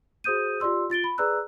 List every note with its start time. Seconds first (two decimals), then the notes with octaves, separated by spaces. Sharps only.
0.24 F#4 G#4 C5 D#6 G6 D#7
0.60 F4 G4 D5 C6 E6
0.90 F4 A6 D7 G7
1.04 B5
1.18 G#4 B4 D5 A#5 E6 F#6